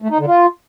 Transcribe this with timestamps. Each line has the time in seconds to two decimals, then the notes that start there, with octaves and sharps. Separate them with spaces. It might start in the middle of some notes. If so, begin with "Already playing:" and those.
0.02 A3
0.10 D#4
0.19 D3
0.28 F4